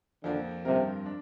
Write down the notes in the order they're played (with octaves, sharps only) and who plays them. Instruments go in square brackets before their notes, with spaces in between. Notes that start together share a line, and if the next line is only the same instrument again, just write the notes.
[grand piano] F2 F3 A#3 [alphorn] D3
[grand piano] G2 F3 C4 A#4 [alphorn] C3
[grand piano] D4